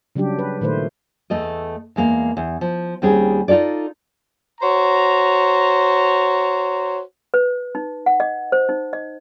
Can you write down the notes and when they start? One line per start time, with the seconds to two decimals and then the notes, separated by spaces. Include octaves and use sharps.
0.15 C#3 F#3 G3 D4 G4
0.39 B4
0.61 A#2 D#3 A3 B4 C5
1.30 E2 A3 A4 D#5
1.96 E2 G#3 A#3 F5
2.37 E2
2.61 F3
3.02 D#2 D#3 G3 C4 C#4 G#4
3.48 D#4 F4 G4 A4 D5
4.61 F#4 C5 C#5 A#5
7.34 B4
7.75 D#4
8.06 F#5
8.20 D#5
8.52 C5
8.69 D#4
8.93 D#5